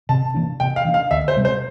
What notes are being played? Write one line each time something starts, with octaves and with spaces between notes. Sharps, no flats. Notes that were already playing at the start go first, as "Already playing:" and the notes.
C3 A5
E3 A#3 D4
C3 G5
F5
E3 A#3 D4
F5
D2 E5
C5
C3 G3 C4
C5